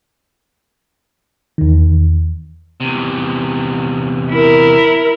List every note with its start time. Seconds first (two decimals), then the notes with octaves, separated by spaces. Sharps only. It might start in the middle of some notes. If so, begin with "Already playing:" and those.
1.58 E2 D#3
2.80 E2 C3
4.31 E4 A#4